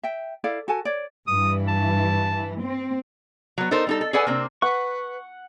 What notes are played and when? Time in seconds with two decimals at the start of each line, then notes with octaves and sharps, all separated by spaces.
0.03 E5 G5
0.44 E4 A4 D5 F5
0.68 F#4 A4 G#5 A5
0.85 C#5 D5
1.28 G2 E3 D#6
1.68 A5
2.62 C4
3.58 F#3 B3
3.71 D#4 A4 A#4 C5
3.87 G3 D#4 A4
4.01 A4
4.13 G#4 A4 B4 D5 F#5 G#5
4.27 C3 A#3 C4 D4
4.62 B4 F#5 C#6